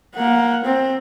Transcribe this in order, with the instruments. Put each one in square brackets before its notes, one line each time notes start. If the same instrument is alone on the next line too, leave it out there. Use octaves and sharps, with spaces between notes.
[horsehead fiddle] A#3 F#5
C4